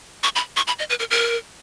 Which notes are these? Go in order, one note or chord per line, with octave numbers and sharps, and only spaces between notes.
C#6
B5
C#6
B5
D#5
B4
A#4
A#4